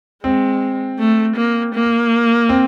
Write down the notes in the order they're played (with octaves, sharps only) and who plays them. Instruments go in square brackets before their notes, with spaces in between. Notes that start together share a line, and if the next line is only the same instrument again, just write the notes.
[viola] G#3 [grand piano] C4
[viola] A3
A#3
A#3
[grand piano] C4